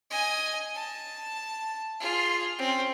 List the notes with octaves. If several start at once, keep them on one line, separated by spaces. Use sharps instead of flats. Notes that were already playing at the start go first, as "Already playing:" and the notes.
D#5 G#5
A5
F4 G#4
C4 C#4